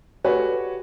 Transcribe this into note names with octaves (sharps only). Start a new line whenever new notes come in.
F#4 G4 A4 B4 C#5 G#5